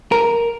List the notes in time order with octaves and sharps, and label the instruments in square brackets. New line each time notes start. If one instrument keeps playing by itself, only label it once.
[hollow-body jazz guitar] A#4